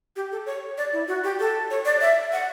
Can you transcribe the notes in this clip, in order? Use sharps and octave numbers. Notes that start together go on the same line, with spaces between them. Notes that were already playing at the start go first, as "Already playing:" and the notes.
G4
A4
C#5
D5
E4
F#4
G4
A4
C#5
D5
E5
F#5